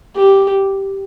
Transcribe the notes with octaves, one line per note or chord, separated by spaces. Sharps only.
G4